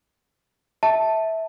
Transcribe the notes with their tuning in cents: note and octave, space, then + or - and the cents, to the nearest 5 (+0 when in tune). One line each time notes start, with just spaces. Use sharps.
E5 -20 A5 +0